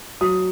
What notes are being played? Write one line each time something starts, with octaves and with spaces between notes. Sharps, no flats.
F#3 D#6